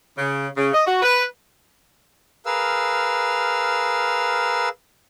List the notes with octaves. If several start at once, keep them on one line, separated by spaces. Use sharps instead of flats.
C#3
C#3
D#5
F#4
B4
G#4 A#4 B4 F5 E6 F6